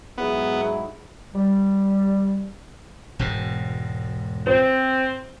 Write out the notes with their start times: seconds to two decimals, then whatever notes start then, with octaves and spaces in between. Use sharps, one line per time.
0.18 G#2 F#3 B3 E4 G#4
1.35 G3
3.19 E1 G#2 B2
4.47 C4 C5